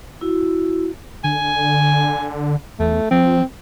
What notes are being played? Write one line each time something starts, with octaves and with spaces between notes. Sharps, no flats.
E4 F#4
D3 G#5
E2 A3
F3 C4